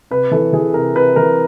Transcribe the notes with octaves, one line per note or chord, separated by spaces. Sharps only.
C3 B4
E3 A4
E3 G#4
C3 A#4
C3 B4
E3 A#4